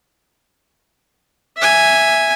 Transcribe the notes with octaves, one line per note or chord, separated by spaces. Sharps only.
E5 G#5